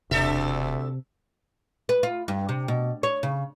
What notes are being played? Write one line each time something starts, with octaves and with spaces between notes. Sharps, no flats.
E1 D2 C3 D4 A4 E5
B4
F4
G2
C3
B2
C#5
C#3